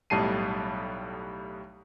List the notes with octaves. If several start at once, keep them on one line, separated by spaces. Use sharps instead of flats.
B1 A2 G3 A5 C7 D#7